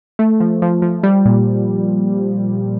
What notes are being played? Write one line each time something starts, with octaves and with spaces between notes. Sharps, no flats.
A3
F3
F3
F3
G3
A#2